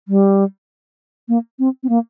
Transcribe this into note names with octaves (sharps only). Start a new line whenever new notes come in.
G3
A#3
C4
C4
A#3